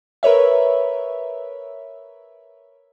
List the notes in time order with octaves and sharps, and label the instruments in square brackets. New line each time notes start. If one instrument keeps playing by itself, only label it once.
[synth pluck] A#4 B4 C#5 E5